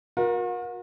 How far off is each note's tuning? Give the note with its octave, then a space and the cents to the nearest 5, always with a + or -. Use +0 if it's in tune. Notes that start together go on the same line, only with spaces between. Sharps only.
F#4 -45 A#4 +25